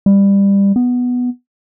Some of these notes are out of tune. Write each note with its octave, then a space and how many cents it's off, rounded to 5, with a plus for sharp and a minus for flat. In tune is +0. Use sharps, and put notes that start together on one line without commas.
G3 +20
B3 +0